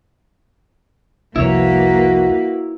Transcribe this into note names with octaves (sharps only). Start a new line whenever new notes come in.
C2 F2 A#3 E4 F#4 B4 C#5